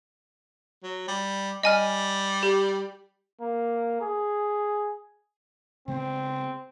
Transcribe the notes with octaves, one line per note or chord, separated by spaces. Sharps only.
F#3
G3
G3 D#5 G#5 F6
G4
A#3
G#4
C#3 G#3 B3 C4